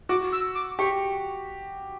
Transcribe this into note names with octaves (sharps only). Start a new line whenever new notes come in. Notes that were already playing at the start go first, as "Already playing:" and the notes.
F#4 D6
E6
D6
G4 C#6